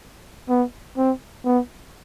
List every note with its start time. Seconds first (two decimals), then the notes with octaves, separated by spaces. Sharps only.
0.49 B3
0.97 C4
1.45 B3